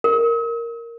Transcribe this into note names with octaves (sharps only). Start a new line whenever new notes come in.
A#4